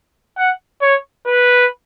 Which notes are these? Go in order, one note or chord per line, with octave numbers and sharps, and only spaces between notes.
F#5
C#5
B4